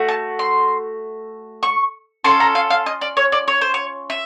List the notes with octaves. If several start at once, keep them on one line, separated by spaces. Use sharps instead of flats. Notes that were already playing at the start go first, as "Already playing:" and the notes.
Already playing: A3 F#4
A5
C6
C#6
C#4 F4 A4 C6
A#5
F5
F5
D#5
D5
C#5
D5
C#5
C5
C#5
E5